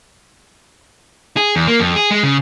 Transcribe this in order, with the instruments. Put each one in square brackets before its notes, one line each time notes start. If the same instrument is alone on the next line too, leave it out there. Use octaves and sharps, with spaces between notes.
[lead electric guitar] G#4
E2
A#3
F2
G#4
G#3
C#3